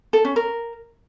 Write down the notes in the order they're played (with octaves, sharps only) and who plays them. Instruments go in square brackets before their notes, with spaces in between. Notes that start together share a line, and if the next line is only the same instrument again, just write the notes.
[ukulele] A4
C#4
A#4